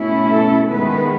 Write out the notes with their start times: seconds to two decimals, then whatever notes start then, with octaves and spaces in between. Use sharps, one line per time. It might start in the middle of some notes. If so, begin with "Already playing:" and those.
Already playing: B2 A3 C#4 E4
0.30 A4
0.68 D#3 G#3 B3 B4